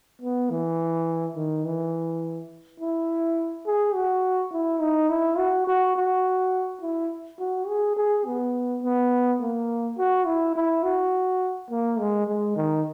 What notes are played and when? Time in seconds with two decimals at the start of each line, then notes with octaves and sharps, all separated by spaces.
0.22 B3
0.50 E3
1.36 D#3
1.65 E3
2.80 E4
3.66 G#4
3.94 F#4
4.52 E4
4.81 D#4
5.10 E4
5.38 F#4
5.67 F#4
5.96 F#4
6.81 E4
7.39 F#4
7.68 G#4
7.97 G#4
8.26 B3
8.83 B3
9.40 A#3
9.98 F#4
10.26 E4
10.56 E4
10.83 F#4
11.70 A#3
11.99 G#3
12.27 G#3
12.56 D#3